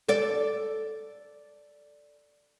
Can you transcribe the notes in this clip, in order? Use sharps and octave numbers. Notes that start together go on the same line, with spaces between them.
A4 D5